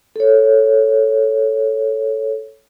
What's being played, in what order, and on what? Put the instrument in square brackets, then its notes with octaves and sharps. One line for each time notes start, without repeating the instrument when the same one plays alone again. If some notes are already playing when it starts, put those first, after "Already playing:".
[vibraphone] A4 C#5